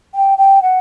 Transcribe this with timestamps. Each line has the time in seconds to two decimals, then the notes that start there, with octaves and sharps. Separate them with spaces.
0.15 G5
0.38 G5
0.62 F#5